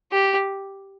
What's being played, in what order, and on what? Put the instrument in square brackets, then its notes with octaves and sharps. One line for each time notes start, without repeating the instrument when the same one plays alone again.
[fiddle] G4